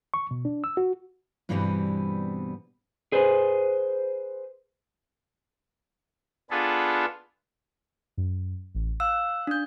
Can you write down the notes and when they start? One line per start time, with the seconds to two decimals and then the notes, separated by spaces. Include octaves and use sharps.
0.14 C#6
0.31 B2
0.45 D4
0.64 E6
0.77 F#4
1.49 G2 B2 E3 G3 B3 C4
3.12 G#4 B4 C5
6.50 B3 D4 F4 G#4 A4 B4
8.17 F#2
8.75 A1
9.00 F5 E6 F#6
9.47 D4 G6